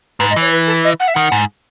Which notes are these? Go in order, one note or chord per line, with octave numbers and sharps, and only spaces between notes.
G#2 B4
D#5
E3 C#5
B4
A4
D#5
F#5
E5
D#3 F#5
G#2